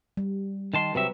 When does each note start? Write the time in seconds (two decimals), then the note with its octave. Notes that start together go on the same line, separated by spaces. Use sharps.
0.17 G3
0.74 D#3 A5 C6
0.95 C3 F#3 B4 E5